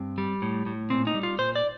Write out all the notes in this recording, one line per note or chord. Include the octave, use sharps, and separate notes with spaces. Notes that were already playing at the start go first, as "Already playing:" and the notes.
Already playing: G2 C4
G3
A2
A2
A#2 C4
D#4
G3
F4
A#2 C5
D5